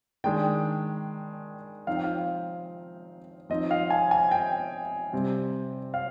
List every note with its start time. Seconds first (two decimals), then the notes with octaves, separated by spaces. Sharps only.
0.24 D#3 G#3 D4 G5
1.87 F3 C4 D#4 F5
1.96 G5
2.04 F5
3.50 F3 C4 D#4 D#5
3.71 F5
3.90 G#5
4.11 G#5
4.31 G5
5.13 C3 G3 C4
5.94 F5